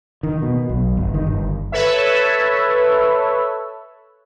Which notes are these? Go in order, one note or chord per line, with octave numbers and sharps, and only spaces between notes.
D#3
B2
B1
G1
D#3
G1
A4 B4 C#5 E5